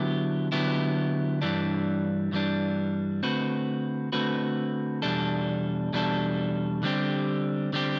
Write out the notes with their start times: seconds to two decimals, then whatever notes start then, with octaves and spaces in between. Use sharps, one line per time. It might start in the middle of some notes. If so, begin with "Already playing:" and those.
Already playing: D3 F#3 B3 E4 G4
0.52 D3 F#3 B3 E4 G4
1.41 G2 E3 G3 D4
2.32 G2 E3 G3 D4
3.23 D3 A3 C4 F#4 B4
4.12 D3 A3 C4 F#4 B4
5.02 E2 B2 G3 D4 A4
5.93 E2 B2 G3 D4 A4
6.83 D3 G3 C4 G4
7.73 D3 G3 C4 G4